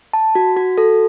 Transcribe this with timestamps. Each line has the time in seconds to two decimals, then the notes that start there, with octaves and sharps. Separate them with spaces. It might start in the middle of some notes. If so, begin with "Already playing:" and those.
0.13 A5
0.35 F#4
0.57 F#4
0.78 A4